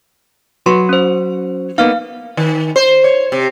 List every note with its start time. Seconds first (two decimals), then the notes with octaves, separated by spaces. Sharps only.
0.66 F#3 F#4 B4 C6
0.89 C#4 C5
1.78 A#3 B3 D#4 F5 F6
2.37 D#3
2.76 C5
3.04 C#5
3.32 C3